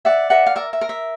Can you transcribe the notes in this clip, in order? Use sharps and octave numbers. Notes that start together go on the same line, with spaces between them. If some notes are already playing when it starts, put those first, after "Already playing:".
D5 E5 F#5
A#4 E5 F#5
F5
A#4 E5
E5
A#4
E5